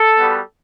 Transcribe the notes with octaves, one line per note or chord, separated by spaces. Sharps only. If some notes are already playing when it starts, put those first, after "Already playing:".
Already playing: A4
G3 B3 F#4